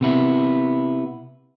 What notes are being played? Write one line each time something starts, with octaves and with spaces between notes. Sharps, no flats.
C3 B3 E4